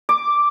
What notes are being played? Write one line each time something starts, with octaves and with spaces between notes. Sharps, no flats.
D6